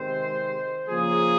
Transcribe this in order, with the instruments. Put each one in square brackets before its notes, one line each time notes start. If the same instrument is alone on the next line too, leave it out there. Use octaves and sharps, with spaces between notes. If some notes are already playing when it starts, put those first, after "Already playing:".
Already playing: [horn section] C3 D#3 G#3 C4 C5
C#3 F3 A#3 G#4